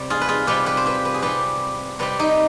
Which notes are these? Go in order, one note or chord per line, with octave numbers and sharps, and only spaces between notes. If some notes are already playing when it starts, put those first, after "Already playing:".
Already playing: C3 G3
F4 G#4
B4
F4 G#4
C3 G3 G4 B4
G4 B4
C5
G4 B4
B4
G#4
C3 G3 G4 B4
C3 G3 G4 B4
D#4 G4